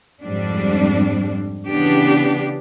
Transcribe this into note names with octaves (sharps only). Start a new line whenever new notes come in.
F2 G#2 G3 C4 D4
C#3 E3 B3 D4 G4